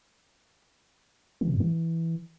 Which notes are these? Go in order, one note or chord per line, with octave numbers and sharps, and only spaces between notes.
E3
C3
G2
E3